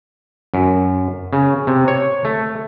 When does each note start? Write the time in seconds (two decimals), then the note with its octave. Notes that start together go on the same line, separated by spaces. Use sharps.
0.54 F#2
1.33 C#3
1.67 C3
1.88 C#5
2.25 A3